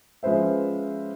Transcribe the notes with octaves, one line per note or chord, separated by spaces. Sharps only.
F3 G#3 C#4 B4 C5 E5